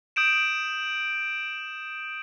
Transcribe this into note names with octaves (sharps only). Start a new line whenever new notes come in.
D#6 G6 D7 E7